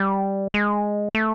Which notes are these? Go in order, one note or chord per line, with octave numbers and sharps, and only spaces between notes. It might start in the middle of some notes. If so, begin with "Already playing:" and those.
Already playing: G3
G#3
A3